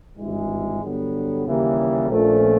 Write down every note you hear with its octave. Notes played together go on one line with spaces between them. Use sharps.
G#1 G2 E3 G#3
G2 D3 F#3 B3
D#2 C#3 E3 G3 A#3
A#1 A#2 F3 A3 C#4